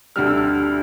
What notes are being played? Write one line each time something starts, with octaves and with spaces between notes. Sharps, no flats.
D2 D3 G3 F6
E6
F6